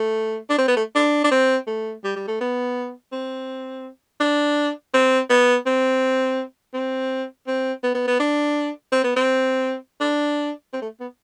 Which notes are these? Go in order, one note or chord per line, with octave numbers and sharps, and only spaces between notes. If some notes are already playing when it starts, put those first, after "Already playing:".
Already playing: A3
D4
C4
B3
A3
D4
D4
C4
A3
G3
G3
A3
B3
C4
D4
C4
B3
C4
C4
C4
B3
B3
B3
D4
C4
B3
C4
D4
C4
A3
B3